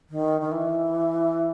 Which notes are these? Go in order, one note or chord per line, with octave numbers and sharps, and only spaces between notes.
D#3
D#3
E3